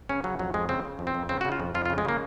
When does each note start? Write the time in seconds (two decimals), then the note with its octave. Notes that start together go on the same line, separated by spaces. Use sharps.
0.09 C#3 C#4
0.24 C#3 F#3
0.39 F2 F#3
0.54 F2 G#3
0.69 C#3 C4
0.85 C#3
0.99 F2
1.07 C4
1.14 F2
1.29 C#3 C4
1.41 F#4
1.45 C#3
1.52 F4
1.60 F2
1.75 F2 F4
1.85 F4
1.90 C#3
1.98 G#3
2.05 C#3 A#3